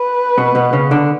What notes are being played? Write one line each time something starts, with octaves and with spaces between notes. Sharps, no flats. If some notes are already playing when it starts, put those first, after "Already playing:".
Already playing: B4
B2 B3
B2 B3
C#3 C#4
D3 D4